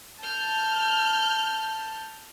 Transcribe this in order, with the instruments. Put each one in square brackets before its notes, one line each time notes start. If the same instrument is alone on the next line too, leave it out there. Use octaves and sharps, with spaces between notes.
[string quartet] A5 [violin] F6 G6